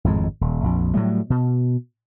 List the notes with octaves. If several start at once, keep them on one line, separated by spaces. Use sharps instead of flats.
G#1 F2 A2 G#3
D#1
A#1 F2
A2 F#3 G3 A3
B2